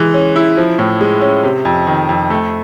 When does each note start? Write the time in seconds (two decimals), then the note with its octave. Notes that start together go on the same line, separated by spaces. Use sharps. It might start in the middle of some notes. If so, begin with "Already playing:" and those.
Already playing: E3 G#3
0.14 C#4
0.36 E4
0.57 F3
0.79 A2
1.01 G#3
1.21 C#4
1.43 C3
1.65 F2
1.87 D#3
2.09 F2
2.30 A3